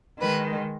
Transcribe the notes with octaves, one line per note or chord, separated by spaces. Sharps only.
D#3 G#3 B4